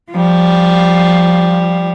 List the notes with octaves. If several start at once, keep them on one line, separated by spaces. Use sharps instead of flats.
F3 G3